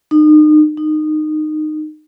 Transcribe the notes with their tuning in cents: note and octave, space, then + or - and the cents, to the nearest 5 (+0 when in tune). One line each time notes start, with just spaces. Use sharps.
D#4 -35
D#4 -20